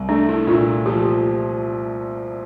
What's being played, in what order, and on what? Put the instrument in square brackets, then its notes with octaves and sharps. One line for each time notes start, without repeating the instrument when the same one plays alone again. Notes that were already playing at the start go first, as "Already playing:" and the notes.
Already playing: [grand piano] C2
[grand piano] A3 [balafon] D4
[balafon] E4
[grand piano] A#2 [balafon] F4
[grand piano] F3 [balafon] G4